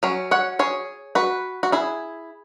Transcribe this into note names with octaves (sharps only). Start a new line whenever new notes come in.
F#3 C#4
C#5 F#5
G#4 C#5
F#4 B4
F#4
E4 G#4